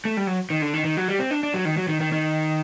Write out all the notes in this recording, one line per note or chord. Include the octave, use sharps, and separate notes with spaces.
A3
G3
F#3
D#3
D3
D#3
D#3
F#3
G3
C4
D4
D4
F#3
D#3
F#3
D#3
D#3
D#3